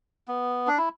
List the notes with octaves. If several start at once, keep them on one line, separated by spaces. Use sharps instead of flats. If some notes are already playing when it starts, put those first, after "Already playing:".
B3
D4
E4